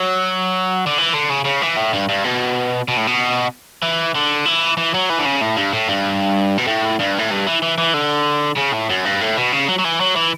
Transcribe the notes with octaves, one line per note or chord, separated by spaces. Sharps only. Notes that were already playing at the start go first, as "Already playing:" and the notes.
Already playing: F#3
D3
E3
D3
C#3
C#3
E3
A2
G2
G2
B2
B2
A2
B2
E3
D3
E3
E3
F#3
E3
D3
C#3
A2
G2
A2
G2
B2
A2
G2
A2
G2
E3
E3
E3
D3
C#3
A2
F#2
G2
A2
B2
C#3
F#3
F#3
E3
F#3
E3